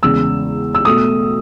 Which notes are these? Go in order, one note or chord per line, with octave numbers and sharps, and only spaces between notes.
E2 C#3 G#3 E6
E6
B2 A3 D#6